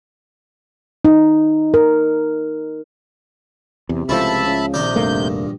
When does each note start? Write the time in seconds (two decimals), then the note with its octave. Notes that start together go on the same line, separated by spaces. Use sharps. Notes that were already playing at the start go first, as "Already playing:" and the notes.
1.05 D#4
1.74 A#4
3.89 E2 C3
4.09 C#2 F3 A3 E4 E5 A5 B5
4.46 C#3
4.74 A#1 C3 D#3 D5 G6
4.96 F1 G2 A3 A#3